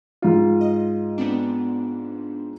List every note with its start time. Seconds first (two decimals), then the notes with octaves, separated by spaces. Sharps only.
0.22 G#2 F4
0.61 D#5
1.18 B3 C4 D4